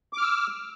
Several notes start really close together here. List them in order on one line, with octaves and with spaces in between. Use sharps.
D6 F6 E6